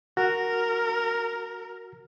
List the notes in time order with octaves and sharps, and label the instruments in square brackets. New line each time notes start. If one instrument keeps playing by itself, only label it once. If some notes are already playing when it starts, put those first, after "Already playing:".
[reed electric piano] F#4 [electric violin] A#4